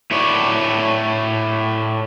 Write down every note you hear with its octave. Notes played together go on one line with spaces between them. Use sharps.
A2 E4 C#5 D5